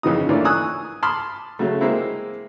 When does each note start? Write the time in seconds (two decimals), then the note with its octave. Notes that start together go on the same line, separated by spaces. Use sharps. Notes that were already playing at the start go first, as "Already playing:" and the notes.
0.03 F2 C#3 E3 F3 D#4 D#6
0.29 E3 A3 A#3 C#4 D4 F4
0.45 G#5 C#6 D#6 E6 F#6
1.03 A5 B5 C6 D6 D#6 F6
1.59 C#3 F#3 A3
1.81 G#3 A#3 C4 E4